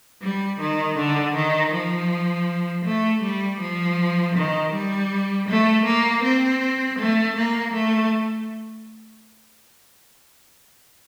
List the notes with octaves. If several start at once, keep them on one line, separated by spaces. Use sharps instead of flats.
G3
D#3
D3
D#3
F3
A3
G3
F3
D#3
G3
A3
A#3
C4
A3
A#3
A3